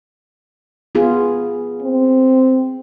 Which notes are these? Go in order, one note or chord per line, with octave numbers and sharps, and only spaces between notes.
B3 F4 G#4
C4